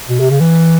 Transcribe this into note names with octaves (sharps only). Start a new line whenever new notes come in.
B2
C3
C#3
E3